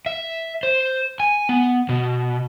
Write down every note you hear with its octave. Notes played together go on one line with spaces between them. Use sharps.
E5
C5
G#5
B3
B2